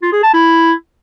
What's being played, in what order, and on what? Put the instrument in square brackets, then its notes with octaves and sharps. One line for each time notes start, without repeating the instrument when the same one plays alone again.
[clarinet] F4
G#4
A5
E4